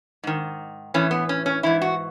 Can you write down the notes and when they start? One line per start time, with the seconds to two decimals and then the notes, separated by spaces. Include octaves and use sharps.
0.23 G#2 D#3
0.94 A2 E3 C#4
1.11 B3
1.29 C#4
1.46 C#4
1.63 G#2 E3 E4
1.82 F#4